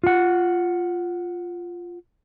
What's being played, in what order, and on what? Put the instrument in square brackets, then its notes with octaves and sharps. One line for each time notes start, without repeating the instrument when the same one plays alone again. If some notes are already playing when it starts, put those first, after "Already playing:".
[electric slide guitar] F4 F#5